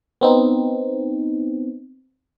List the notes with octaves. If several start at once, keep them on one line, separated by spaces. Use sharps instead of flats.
B3 C4 D#4